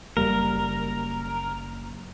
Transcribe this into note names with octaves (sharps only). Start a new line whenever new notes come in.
F#1 G3 A#3 A#4